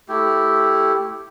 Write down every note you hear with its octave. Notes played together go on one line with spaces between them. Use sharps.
A3 E4 G4